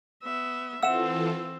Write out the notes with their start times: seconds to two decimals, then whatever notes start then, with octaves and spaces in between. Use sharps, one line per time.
0.22 B3 E5
0.83 E3 C4 F4 A4 E5 F#5 E6 E7